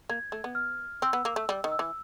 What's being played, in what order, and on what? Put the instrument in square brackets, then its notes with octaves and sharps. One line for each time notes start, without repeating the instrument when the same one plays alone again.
[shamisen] A#3 [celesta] G#6
[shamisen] A3
B3
[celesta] F6
[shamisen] C4 [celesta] E6
[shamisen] B3
A#3
A3
G3
D#3
[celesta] E6
[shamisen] E3